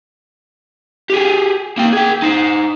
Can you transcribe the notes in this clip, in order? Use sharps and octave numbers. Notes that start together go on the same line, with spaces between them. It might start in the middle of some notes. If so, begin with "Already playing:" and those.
G4 G#4
A#3 G5
G#4 G5
D#4 C5